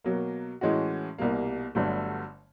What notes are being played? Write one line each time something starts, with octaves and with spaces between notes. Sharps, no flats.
B2 F#3 A#3
A2 E3 G#3 C#4 F#4
C2 B2 G3 A#3
G1 G2 D3 F#3 A3